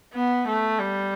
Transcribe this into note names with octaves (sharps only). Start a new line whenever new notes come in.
B3
A3
G3